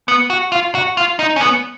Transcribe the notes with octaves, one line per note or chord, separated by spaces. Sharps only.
B3
F#4
F4
F#4
F4
D#4
C#4
B3